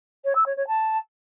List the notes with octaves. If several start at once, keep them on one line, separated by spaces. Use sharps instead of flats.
C#5
E6
C#5
C#5
A5